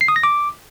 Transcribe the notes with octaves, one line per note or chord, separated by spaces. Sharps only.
C7
D#6
A#6
D6